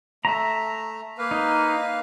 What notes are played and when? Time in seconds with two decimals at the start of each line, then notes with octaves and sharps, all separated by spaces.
0.25 A3 E5 A#5
1.18 A#3 B4 F5
1.31 D#4